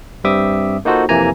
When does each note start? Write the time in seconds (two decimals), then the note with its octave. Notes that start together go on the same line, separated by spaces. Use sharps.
0.24 G2 G3 C4 E5 D6 D#6
0.85 A#3 D#4 F4 F#4 A4 C5
1.09 F2 C3 E3 A#3 G#5 A#5